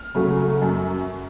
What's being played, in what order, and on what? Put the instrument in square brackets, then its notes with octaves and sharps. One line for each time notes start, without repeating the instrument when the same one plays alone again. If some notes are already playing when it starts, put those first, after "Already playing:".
Already playing: [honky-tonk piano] F6
C#3 F#3 A3
F#2